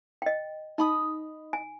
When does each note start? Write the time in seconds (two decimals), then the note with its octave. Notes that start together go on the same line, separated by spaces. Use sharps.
0.22 D#5 G5
0.78 D#4 D#5 B5 D#6
1.53 G#5